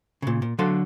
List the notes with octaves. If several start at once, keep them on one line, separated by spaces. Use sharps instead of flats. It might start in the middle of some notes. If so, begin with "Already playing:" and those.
A#2 C#3
A#2
D3 F#3 A4 F5 C6